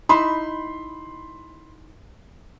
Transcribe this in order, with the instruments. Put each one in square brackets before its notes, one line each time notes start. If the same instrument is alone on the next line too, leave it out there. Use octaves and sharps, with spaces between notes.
[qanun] D#4 E4 E5 [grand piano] B5 C6